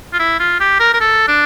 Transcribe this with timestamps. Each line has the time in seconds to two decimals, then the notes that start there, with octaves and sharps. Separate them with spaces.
0.13 F4
0.19 E4
0.40 F4
0.60 G4
0.80 A#4
0.94 A#4
1.00 A4
1.28 D4